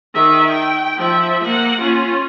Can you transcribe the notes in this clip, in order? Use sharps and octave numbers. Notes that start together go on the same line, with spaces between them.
D#3 E5
G5
F3 E5
A#3 F#5
C#4 F4